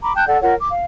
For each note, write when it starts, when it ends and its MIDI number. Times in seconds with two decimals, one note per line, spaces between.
0.02 0.13 82
0.02 0.13 83
0.02 0.13 86
0.15 0.24 79
0.15 0.24 81
0.15 0.24 90
0.15 0.24 91
0.27 0.40 69
0.27 0.40 74
0.27 0.40 78
0.42 0.53 65
0.42 0.53 70
0.42 0.53 73
0.42 0.53 78
0.58 0.68 86
0.70 0.84 77